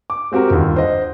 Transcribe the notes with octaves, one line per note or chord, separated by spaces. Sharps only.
D6
G#3 C4 F#4 G4 A#4
G1 D#2 F4
C5 D#5 F#5